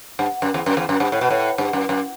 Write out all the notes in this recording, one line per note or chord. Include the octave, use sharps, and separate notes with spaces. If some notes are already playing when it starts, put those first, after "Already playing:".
G2
F#2
E2
F#2
E2
F#2
G2
A2
B2
A2
G2
F#2
F#2